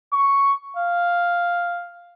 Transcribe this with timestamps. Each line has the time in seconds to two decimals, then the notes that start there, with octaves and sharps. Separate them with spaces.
0.13 C#6
0.77 F5